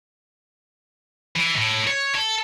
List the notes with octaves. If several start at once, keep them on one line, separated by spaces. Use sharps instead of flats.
E3
A2
C#5
A4